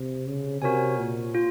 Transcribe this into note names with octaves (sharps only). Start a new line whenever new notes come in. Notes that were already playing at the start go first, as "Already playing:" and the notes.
Already playing: C3
C#3
C3 F#4 A#4 C#5 G#5
A#2
F4